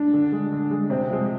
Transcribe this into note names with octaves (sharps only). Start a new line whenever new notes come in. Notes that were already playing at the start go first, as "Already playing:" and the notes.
Already playing: D4
D3
G#3
D3
G#3
C3 C4
F3 G#3